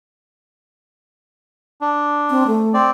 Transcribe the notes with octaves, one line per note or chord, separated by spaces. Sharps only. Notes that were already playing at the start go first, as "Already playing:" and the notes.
D4
C4
A3
C4 D5